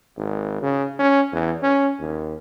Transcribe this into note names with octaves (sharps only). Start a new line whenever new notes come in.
G#1
C#3
C#4
E2
C#4
D#2